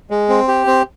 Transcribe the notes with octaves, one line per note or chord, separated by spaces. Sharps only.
G#3
C4
G4
C4